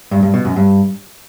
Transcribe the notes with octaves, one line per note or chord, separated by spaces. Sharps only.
G2
G2
B2
F#2
G2